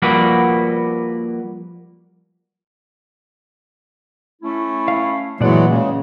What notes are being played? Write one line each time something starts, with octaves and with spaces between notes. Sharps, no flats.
F3 G3 A#3 F#4 B4 D5
A3 C#4 E4
F5
A#2 E3 F#3 G#3 A3 D5 F#5
C#3 G#3